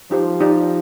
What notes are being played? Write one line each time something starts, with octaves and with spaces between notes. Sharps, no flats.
F3 D#4 G4 C5
D#4 G4 D5